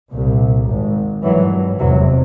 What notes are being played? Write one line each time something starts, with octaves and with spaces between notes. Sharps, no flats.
C2 A#2
G#1 G#2
G#1 G2 E3 F#3
F1 E2 C3 E3 F#3